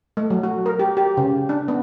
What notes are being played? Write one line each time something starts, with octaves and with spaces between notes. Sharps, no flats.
A3
F#3
F#4
A#4
G4
G4
C#3
D4
B3